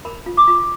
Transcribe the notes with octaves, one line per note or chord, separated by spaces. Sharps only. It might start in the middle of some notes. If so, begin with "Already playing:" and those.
A#4 B5
F4
D6
F4